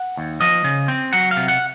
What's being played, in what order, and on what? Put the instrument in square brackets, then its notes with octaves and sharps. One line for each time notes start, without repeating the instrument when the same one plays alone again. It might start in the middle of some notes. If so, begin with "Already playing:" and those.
Already playing: [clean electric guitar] F#5
D#2
F3 D#5
C#3
C4
F#3 F#5
F5
C3
F#5